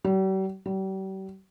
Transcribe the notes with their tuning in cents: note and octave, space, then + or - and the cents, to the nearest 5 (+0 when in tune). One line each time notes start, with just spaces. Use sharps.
G3 -45
G3 -40